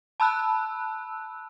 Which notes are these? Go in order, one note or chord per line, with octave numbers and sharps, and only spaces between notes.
A5 B5 E6 F#6